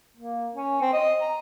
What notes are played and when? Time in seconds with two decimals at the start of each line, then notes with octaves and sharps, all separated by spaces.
0.17 A#3
0.55 C#4
0.81 C4
0.93 D#5
1.21 A#5